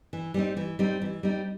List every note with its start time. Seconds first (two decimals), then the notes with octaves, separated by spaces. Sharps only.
0.13 E3
0.34 G3 C4 D#4
0.57 E3
0.79 G3 C4 D#4
1.02 E3
1.23 G3 C4 D#4